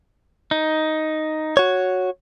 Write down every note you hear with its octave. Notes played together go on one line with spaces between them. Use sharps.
D#4
F#4 C#5